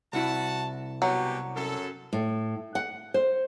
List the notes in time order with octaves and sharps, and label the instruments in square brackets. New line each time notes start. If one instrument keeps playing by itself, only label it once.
[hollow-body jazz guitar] C2 E4 [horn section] F#4 A5
[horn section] B2 G4 [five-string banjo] F#3
[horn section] F#2 A4
[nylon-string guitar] A2
F#5
C5